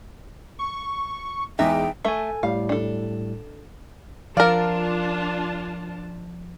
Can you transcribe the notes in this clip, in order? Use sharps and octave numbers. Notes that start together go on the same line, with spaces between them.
C#6
E2 E3 G#3 D#4 E5 G5
A3 A4 E5 G#5
A2 G3 F5
D4 A4
F3 D4 F4 A#4 D5 F5 A5